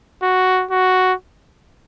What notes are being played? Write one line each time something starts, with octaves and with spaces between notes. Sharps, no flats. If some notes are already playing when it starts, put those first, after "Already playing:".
F#4
F#4